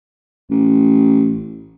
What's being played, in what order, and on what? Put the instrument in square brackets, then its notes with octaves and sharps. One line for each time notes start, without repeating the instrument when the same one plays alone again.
[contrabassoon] A1